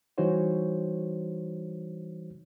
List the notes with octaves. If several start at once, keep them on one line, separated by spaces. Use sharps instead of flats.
E3 G3 D#4 F#4 C5 C#5